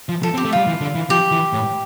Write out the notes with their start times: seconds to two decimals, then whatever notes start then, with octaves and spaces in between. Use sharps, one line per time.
0.09 F3
0.23 F3 A4
0.34 C4
0.37 G4
0.45 A3
0.53 G3 F4
0.67 E3
0.81 D3
0.95 E3
1.10 F3 G4
1.31 E3
1.53 A2